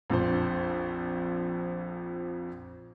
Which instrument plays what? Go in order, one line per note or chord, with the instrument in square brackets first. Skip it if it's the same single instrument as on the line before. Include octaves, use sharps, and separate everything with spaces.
[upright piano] A#1 F2 D4 C5